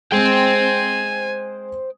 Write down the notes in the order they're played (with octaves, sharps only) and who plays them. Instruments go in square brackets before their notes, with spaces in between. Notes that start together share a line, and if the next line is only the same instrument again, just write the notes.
[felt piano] G#3 C4 [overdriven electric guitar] C5 G5 [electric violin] G#5